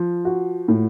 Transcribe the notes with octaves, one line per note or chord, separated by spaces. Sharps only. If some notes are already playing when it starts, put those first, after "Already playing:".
Already playing: F3
F#4
A2